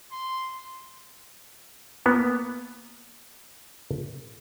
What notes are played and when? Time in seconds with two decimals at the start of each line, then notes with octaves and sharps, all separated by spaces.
0.12 C6
2.06 A#3 B3